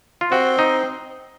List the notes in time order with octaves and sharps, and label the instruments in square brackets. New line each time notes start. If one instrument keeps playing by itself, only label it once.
[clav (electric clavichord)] F4
[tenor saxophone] C4 [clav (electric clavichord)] F#4
[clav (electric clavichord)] D#4